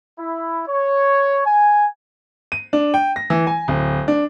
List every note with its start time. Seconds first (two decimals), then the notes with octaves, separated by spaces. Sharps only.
0.19 E4
0.68 C#5
1.45 G#5
2.52 D#7
2.73 D4
2.94 G5
3.16 A#6
3.30 E3
3.47 G#5
3.68 D1
4.08 D4